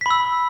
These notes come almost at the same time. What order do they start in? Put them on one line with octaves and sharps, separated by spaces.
B6 B5 E6